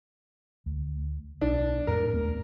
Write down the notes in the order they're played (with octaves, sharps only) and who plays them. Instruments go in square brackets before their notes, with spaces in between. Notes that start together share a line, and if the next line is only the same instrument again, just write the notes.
[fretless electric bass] D2
[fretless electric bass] B1 [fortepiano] D4
[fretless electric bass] F2 A2 [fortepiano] A#4
[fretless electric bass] D#2 A3 B3